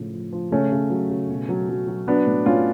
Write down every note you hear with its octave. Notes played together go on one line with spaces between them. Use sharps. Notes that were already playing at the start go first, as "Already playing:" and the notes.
Already playing: A2 C#3 F3
F3
F3
C#3 A3 C#4
C#3
F#3
C#3
B2
F#3
F#3
F#3
F#3 B3 D4
A2
A2 C#4 F4